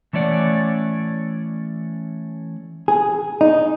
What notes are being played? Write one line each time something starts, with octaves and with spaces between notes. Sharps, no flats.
E3 A3 C#4 D5 F#5
G#4
D#4